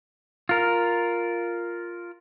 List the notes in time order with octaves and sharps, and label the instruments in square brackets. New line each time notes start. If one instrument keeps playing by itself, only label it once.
[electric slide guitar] F4 A#4